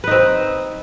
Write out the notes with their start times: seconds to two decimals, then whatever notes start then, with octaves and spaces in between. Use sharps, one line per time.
0.04 B4
0.07 D#4
0.11 C4